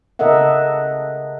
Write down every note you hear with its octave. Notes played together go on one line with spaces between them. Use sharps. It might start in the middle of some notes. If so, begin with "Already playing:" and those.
C#3 A4 A#4 D#5 E5 F#5